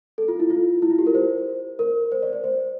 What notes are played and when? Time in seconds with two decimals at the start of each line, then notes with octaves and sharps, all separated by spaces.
0.18 A4
0.28 F4
0.40 E4
0.50 F4
0.82 E4
0.90 F4
0.99 G4
1.07 A#4
1.15 C5
1.79 A#4
2.12 C5
2.23 D5
2.33 C5
2.44 C5